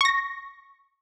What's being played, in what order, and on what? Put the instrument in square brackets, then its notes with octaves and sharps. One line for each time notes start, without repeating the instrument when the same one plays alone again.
[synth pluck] C#6 A#6